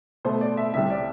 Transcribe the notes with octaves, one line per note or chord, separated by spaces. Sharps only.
B2 A3 C5
D5
E5
C2 C3 G3 E5
D5